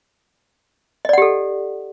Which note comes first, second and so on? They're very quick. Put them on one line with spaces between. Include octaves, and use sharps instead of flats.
D#5 D5 F#5 G4 A4